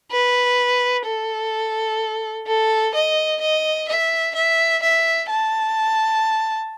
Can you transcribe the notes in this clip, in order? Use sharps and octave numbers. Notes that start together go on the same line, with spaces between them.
B4
A4
A4
D#5
D#5
E5
E5
E5
A5